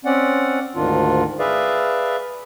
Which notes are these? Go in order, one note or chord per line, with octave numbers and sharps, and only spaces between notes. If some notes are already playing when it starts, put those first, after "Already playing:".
C4 C#4 D5 F#5
D2 G#2 D#3 D4 F4
G#4 B4 D5 E5 F5